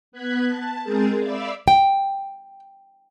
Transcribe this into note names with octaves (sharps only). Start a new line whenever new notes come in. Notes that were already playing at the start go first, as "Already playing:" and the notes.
B3 F#6 G#6 B6
A5
G#3 C4 G#4 A#4 G6 A6
D5 E5 F5 B5 D6 E6
G5